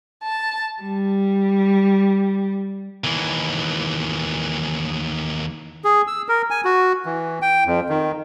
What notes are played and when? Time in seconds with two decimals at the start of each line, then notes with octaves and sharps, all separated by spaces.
0.23 A5
0.82 G3
3.04 D#2 E3
5.84 G#4
6.07 E6
6.28 A#4
6.50 G#5
6.65 F#4
7.06 E3
7.42 G5
7.66 F2
7.89 D#3